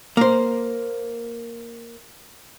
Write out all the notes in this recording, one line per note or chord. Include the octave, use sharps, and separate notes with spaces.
A#3 C5